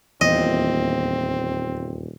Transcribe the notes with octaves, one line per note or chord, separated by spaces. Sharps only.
D#1 E2 A#2 C4 D#5